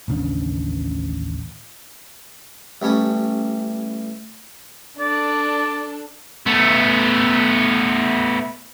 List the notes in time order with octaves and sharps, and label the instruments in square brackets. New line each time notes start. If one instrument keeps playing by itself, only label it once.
[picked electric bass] A1 D#2 C#3 D4
[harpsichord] A1 G3 C#4 D#6
[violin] D4 A4 [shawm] D5
[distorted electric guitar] A3 B3